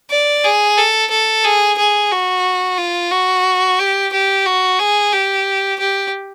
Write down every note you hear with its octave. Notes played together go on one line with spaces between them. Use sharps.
D5
G#4
A4
A4
G#4
G#4
F#4
F4
F#4
G4
G4
F#4
G#4
G4
G4